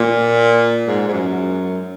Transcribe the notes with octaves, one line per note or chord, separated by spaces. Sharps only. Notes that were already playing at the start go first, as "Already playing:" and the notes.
Already playing: A#2
G#2
G#2
F#2